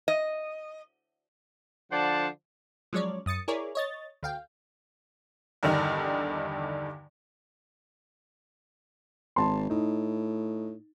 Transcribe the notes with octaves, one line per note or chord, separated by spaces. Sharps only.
D#5
D3 F3 C5 D5 F#5 A5
F3 F#3 G#3 C#4 C#5 D5
F#2 D#6 A6 C#7
E4 G#4 A#4 C#5 D5
C#5 D#5 A6
D2 F5 G5
E2 G2 D3 D#3 D4 D#4
G#1 A5 C6
A2 D#4